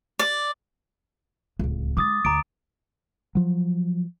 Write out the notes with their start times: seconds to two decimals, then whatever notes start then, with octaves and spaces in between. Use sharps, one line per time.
0.19 D5
1.59 D1 C#2
1.97 G#3 D#4 D6 D#6 A6
2.25 D2 A#5 D6 D7
3.35 F3 F#3